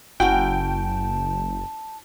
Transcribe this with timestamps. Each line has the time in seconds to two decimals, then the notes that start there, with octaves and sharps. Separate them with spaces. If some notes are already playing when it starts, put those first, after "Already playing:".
0.20 F#1 C#4 E4 F#4 G5 A5